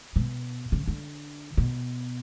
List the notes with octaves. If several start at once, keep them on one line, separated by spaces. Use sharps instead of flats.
B2
C#3
D3
B2